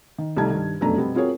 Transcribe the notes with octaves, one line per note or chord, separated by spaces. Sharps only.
D#3
C2 G3 A3 D#4 A5 G#6
G2 D#3
F1 F#2 B2 A3 D4 A#5
B2 G3 B3 C4
C4 F4 F#4 G#4 A#4 C#5